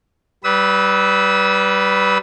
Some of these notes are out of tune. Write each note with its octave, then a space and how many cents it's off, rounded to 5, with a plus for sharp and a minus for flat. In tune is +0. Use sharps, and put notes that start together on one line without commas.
G3 -20 B4 +0 E6 -40